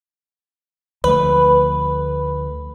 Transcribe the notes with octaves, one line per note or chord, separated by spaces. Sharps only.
D2 F3 A3 B4